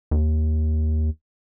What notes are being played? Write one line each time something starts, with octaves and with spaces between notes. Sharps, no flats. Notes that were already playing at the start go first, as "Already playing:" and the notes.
D#2